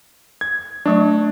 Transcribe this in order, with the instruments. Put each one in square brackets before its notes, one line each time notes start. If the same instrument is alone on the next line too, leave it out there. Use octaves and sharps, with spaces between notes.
[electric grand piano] G#6
[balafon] F#3 A3 C#6 [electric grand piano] D4